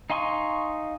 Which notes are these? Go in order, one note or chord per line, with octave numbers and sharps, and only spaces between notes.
D#4 F5 G#5 C6 C#6